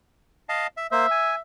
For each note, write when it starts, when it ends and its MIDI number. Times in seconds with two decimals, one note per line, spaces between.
0.49 0.67 75
0.49 0.67 77
0.49 0.67 81
0.77 0.87 76
0.92 1.06 58
0.92 1.06 72
0.92 1.39 76
1.11 1.35 80